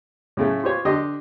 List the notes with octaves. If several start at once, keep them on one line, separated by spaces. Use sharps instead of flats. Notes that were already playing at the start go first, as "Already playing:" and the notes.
A2 C#3 A3
F4 G4 C5 C#5
D3 G4 D#5 C6